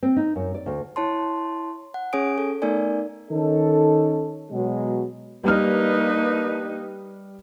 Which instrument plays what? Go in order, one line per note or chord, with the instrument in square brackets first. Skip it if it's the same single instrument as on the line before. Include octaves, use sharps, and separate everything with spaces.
[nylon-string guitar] C4
D#4
F#2
D5
D2
[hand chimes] E4 C#5 A5 C6
F#5
C#4 G#4 C#5 G#5 D#6 D7
A4
A3 B3 D#4 A#4 D5 G#5
[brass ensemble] D#3 C#4 D#4 A4
B2 F#3 G#3
[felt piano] G3 F6 [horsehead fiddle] A#3 D#4 [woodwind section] D4 A#4 B4